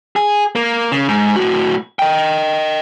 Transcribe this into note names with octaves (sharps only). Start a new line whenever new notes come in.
G#4
A#3
C#3
G#2
A2 F#4
D#5 G5